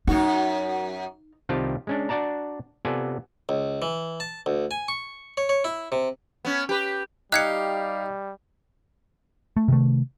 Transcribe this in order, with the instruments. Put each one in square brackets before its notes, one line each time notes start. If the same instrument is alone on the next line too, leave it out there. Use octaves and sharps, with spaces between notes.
[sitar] F#2 F#4 [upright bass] D#4
[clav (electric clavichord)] C2 D#3 C4 F4 G4 A5
G#3 C#4 D4
D4 F#4 D5 A5 A#5
C3 B3 F4 A4 D5 G#5
[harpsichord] C#2
E3
A5
D2
G#5
C#6
C#5
C#5
E4
C3
[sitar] B3 C#4
G4 B4
[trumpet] G3 [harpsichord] D#4 [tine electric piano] G4 F5 [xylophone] F#6 G#6 C#7
[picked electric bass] A3
C3 D#3 A3